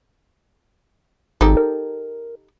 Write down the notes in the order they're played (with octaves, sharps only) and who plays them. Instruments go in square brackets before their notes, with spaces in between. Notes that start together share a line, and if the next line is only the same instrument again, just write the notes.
[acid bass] G#1 [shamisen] D#4 G4 A4
[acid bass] A#4